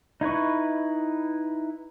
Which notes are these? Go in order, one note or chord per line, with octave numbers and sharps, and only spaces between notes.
D#4 E4 B4 C#6